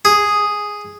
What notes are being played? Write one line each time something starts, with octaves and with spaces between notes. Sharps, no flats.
G#4